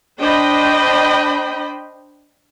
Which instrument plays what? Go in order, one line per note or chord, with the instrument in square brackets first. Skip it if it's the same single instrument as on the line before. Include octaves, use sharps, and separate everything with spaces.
[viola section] D4 C5 D#5 G5 B5